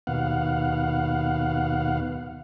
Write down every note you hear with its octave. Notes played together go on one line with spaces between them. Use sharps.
D#2 B2 F5 F#5